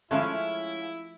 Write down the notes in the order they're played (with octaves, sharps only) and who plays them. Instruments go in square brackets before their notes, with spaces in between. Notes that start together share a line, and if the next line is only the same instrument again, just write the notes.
[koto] F3 A3 [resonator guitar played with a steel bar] G#3 C#4 F5 [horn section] E4